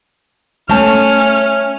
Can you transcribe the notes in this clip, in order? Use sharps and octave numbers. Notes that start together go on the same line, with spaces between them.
A3 C#4 A5 F6